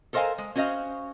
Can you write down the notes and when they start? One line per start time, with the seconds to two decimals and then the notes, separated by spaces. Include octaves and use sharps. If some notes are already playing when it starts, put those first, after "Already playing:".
0.13 A4 A#4 C5 D#5 F5 G#5
0.38 G#3
0.55 C#4 F#4 C5 D#5 F5